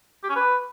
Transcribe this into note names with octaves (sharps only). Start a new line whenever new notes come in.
G4
C#4
B4